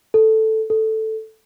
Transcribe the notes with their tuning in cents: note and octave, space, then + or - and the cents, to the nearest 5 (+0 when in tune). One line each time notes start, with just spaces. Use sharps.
A4 +0
A4 +0